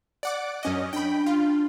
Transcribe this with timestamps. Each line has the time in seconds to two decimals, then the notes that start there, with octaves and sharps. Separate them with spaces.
0.23 D5 F#5 D6
0.63 F#2 C#4 D#5
0.93 D4 G5 B5
1.26 F4